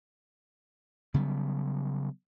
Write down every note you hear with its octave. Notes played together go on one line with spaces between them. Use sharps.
C#3 F#3 G3 B3